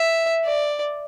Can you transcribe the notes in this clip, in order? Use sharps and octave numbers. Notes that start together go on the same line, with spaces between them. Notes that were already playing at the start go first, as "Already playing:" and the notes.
Already playing: E5
D5